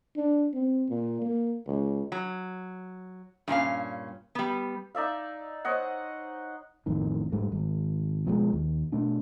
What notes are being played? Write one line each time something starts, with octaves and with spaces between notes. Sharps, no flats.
D4
C4
A#2
A#3
C#2
F#3
G2 A#2 C#4 F5
G3 B3
D#4 D5 E5 F5
C5 C#5 D#5 F#5
A1 F2 A2 D#3
G#2 G3 A3
G#1
B2 F3 G3 G#3
D#2
B2 A3 D4